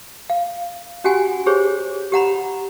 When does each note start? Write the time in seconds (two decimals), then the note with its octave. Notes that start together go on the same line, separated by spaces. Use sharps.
0.30 F5
1.04 C#4 F#4 G4 F#5 G#5
1.46 G4 G#4 C5 C#5
2.12 G4 F#5 A#5 B5